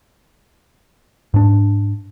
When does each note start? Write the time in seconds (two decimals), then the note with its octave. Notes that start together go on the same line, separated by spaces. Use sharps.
1.34 G#2 D4